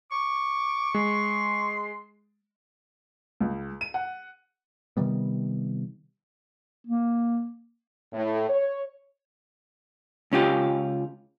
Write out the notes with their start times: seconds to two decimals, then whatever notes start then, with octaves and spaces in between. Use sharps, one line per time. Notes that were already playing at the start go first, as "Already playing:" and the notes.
0.12 C#6 D6
0.94 G#3 C6
3.41 C#2
3.81 D#7
3.94 F#5
4.97 C3 D#3 G3 B3
6.87 A#3
8.12 A2
8.49 C#5
10.32 C#2 C#4 F4 G4